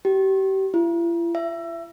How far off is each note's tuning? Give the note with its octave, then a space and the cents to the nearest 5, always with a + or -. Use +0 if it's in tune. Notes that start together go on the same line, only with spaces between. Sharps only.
G4 -35
E4 +45
E5 +25